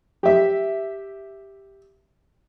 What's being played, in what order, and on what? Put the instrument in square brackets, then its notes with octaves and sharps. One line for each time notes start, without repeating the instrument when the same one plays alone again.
[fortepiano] G4 E5